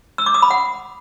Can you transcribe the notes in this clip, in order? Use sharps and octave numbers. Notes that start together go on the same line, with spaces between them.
E6
D6
D#6
B5
F#5